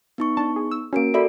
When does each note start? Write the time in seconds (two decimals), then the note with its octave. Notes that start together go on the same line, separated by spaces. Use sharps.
0.18 B3 D#4 C#6
0.37 D4 A5
0.56 G#4
0.71 E6
0.93 A#3 C#4 F#4 A#4 D7
1.14 F#4 A4 D5 E5 B5